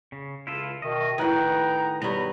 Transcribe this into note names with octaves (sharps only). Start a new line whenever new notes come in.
C#3
C#2 E4 F4 A4
B2 D#3 D#5 E5
A2 D#3 G#4 B4 F#5 G5 A#5
G2 B2 F#3 B3 A#5